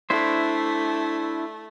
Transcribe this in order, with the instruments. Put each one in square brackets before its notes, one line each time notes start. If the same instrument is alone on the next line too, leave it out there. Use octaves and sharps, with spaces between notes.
[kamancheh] A3 [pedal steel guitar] D4 E4 C5